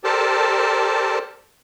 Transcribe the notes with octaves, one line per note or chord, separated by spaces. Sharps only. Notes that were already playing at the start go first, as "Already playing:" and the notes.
G4 A4 A#4 C5 D5 A5